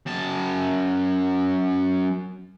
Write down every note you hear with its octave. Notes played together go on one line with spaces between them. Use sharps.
F#2 A5